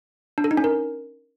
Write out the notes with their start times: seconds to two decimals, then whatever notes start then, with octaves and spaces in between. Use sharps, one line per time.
0.38 D4
0.44 A4
0.51 D#4
0.57 C#4
0.64 A#4